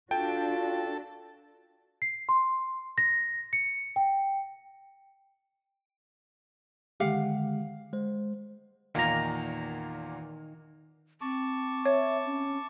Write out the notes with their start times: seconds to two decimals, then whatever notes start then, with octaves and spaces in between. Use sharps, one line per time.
0.11 D4 F4 F#4 A4 G5
2.02 C7
2.29 C6
2.98 A#6
3.53 C#7
3.96 G5
7.00 D3 D#3 G#3 G4 F5 F#5
7.93 G#3 C5
8.95 E2 A#2 D#3 A#3 A#5
11.21 C4 A5 C#6 D6
11.85 C#5 E5
12.26 C#4